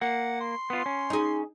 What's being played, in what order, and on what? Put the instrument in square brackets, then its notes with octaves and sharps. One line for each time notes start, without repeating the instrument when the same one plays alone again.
[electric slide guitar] A#3 [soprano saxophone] F#5
[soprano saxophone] C6
[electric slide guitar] B3 F4
C#4
[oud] D#4 G#4